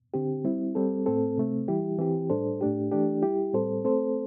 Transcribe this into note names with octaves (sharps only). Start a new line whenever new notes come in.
D3 C4 G4
G3 C4 E4
G3 C4 A4
A2 A3 C4 A4
C3 A3 C4
E3 G3 E4 G4
E3 C4 G4
A2 G3 D4 A4 C5
A2 A3 D4 G4
E3 A3 D4 G4
G3 E4 G4
A2 G3 C4 A4 C5
A3 C4 A4 C5